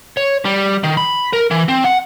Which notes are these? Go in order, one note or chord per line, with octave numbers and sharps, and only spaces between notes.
C#5
G3
D#3
B5
A#4
E3
C4
F#5